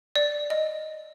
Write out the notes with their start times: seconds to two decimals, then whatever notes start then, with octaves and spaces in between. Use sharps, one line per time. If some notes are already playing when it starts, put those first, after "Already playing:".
0.16 D5
0.50 D#5